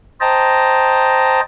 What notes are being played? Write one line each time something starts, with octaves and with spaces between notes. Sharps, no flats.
C5 D#5 G5 A5 A#5